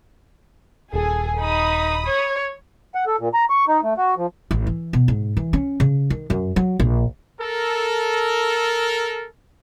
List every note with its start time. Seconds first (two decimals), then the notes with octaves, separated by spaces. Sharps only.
0.93 D#1 G#4 A4
1.40 D#4 B5 D#6
2.06 C#5
2.95 F#5
3.07 A4
3.19 A#2
3.34 A#5
3.50 C#6
3.68 D#4
3.83 A3
3.97 F#4
4.17 F3
4.51 A1
4.67 E3
4.93 B2
5.08 G#2
5.37 E3
5.53 C#4
5.80 C#3
6.10 D#3
6.30 F#2
6.56 F#3
6.79 A#1
7.40 A4 A#4